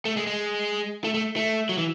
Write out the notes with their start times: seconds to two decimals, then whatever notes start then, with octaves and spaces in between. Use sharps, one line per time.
0.05 A3
0.17 G#3
0.27 G#3
1.04 A3
1.14 A3
1.36 A3
1.69 F#3
1.78 E3